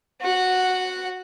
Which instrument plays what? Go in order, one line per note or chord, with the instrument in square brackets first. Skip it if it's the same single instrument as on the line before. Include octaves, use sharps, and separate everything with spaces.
[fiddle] F#4 F#5